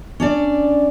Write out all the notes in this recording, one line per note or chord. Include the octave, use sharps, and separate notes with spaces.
C#4 D4 D5